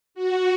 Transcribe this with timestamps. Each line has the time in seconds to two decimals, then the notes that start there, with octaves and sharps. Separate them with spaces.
0.15 F#4